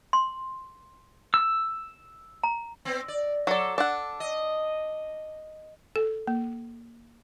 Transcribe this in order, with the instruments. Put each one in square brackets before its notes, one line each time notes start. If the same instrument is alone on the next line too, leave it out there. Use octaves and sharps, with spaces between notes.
[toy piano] C6
[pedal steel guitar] E6
[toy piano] A#5
[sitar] B3 C4
D5
[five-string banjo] F#3 D5 [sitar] A4
[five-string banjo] D4 F#5
[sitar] D#5
[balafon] A4
A#3